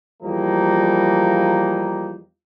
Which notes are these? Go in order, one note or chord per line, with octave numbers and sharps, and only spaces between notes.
E2 F3 G3 A#3 D#4